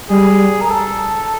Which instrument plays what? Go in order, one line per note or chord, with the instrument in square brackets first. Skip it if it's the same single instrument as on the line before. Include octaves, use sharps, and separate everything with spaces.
[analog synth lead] G3 [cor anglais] G#4
[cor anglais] A#4
A4